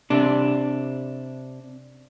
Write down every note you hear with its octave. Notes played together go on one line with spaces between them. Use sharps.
C3 D4